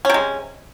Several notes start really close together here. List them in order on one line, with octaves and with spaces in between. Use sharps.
C#4 C3 G#3